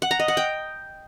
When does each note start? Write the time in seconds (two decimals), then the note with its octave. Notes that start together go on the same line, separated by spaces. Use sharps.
0.02 F#5
0.11 A#5
0.20 D#5
0.28 F#5
0.37 G5